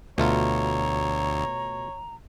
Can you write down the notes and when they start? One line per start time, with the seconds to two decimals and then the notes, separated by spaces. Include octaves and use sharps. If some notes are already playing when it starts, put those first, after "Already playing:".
0.18 D2 B2 A3 F4 C#5 A#5